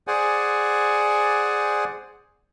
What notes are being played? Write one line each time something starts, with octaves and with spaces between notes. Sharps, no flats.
G#4 C5 D5 F#5 G#5